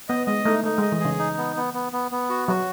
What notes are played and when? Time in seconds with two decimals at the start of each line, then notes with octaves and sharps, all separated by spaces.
0.08 B3 D#5
0.27 G#3 D#5
0.45 A3 D#4
0.63 A3 D#4
0.78 G#3 D#5
0.92 E3
1.00 C#3 G#4
1.19 D#4
1.38 B3
1.57 B3
1.74 B3
1.93 B3
2.12 B3
2.29 F#4
2.48 F#3 F#4